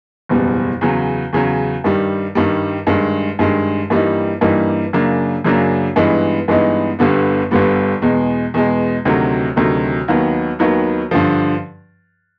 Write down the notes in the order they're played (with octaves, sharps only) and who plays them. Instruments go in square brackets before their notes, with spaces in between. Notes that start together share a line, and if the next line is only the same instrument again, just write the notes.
[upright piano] F#1 E2 B2 G3
E2 C#3 F#3
E2 C#3 F#3
G2 D#3 G3
G2 D#3 G3
G2 D#3 G#3
G2 D#3 G#3
G2 E3 G3 A#3 D#4
G2 E3 G3 A#3 D#4
F#2 C#3 F#3 A#3 D4
F#2 C#3 F#3 A#3 D4
G2 E3 G#3 B3 D#4
G2 E3 G#3 B3 D#4
G1 G2 D3 G3 B3
G1 G2 D3 G3 B3
E2 B2 G#3
E2 B2 G#3
D2 C3 D#3 F#3 A3
D2 C3 D#3 F#3 A3
D#2 D#3 F#3 B3
D#2 D#3 F#3 B3
G2 D3 F3